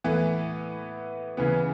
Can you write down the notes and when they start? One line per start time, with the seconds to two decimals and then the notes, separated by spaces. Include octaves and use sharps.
0.04 A2 E3 B3
1.37 C#3 E3 B3